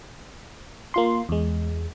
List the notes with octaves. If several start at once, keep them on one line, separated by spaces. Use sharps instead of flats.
A#3 F4 C6
E2 G#3